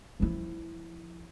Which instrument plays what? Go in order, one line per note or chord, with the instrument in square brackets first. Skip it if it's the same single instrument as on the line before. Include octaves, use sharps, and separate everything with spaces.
[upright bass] F3 E4